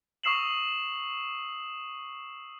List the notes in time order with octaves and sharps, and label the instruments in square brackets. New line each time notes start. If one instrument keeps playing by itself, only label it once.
[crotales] C#6 D#6 E6 C7 E7 F#7